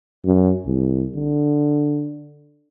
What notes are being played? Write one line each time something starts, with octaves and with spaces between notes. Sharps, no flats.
F#2
C2
D3